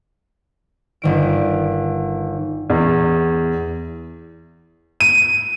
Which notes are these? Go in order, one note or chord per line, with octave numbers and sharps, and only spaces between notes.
G1 D#3 D7
E2
D#7